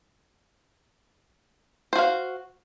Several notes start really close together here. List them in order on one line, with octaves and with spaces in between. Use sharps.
C5 F#4 F5